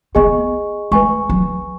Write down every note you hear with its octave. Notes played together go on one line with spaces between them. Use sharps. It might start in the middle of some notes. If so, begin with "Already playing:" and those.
B3 G#4 D#5 G#5 C#6
G#3 B4 G#5 C#6
F#3